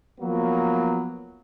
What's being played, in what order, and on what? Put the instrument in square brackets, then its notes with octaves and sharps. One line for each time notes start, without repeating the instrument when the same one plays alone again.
[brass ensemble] F3 F#3 A#3 B3